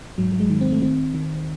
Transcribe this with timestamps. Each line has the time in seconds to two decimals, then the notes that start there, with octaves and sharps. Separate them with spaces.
0.18 G#2 F#3
0.32 F#3
0.40 G#3
0.50 D#3
0.61 C4
0.72 A3
0.82 D#3 C4
1.14 D#3